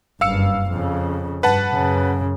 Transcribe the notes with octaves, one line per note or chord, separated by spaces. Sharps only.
F#1 G2 F5 E6 C#7
F2 C#3
G2 B4 F#5 A5
F#2 C#3